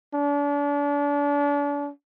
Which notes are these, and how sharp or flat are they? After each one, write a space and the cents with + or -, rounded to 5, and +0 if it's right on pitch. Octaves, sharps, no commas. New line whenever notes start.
D4 -35